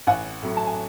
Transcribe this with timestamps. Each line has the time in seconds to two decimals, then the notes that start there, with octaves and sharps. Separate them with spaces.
0.07 A1 F#5 G#5
0.42 A2 F#3
0.57 A5
0.67 G#5